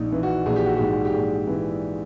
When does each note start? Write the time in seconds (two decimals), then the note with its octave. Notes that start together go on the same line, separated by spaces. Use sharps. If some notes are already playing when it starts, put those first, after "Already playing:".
Already playing: A#1 D#4
0.12 E3
0.23 F#4
0.46 A#1 G#4
0.56 G4
0.66 F#4
0.76 G#2 G4
1.05 G4
1.13 A#1 G#4
1.48 E3